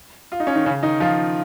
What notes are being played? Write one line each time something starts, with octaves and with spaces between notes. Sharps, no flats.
F4
D#4
C#4
D#3 D#4
C#3 C#4
D#3 D#4
F3 F4